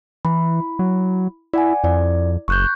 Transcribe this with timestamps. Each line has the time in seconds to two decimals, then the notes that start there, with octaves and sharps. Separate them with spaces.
0.25 E3 E4 B5
0.79 F#3
1.53 E4 D5 F#5 G#5
1.84 F2 E4 D5
2.48 F#1 C#6 F#6 G6